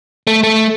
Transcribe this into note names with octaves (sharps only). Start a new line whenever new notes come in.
A3
A3